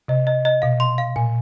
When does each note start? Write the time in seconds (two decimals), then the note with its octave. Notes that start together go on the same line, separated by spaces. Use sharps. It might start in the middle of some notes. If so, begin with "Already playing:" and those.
0.08 C3 D#5
0.27 D#5
0.45 D#5
0.62 B2 F5
0.80 C6
0.98 F5
1.16 A#2 G#5